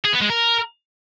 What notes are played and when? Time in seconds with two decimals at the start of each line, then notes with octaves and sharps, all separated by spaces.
0.05 G#4
0.13 B3
0.22 G#3
0.30 A#4